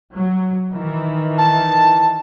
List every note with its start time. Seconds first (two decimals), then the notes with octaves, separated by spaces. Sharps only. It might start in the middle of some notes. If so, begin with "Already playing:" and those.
0.14 F#3
0.72 D#3 E3
1.38 A5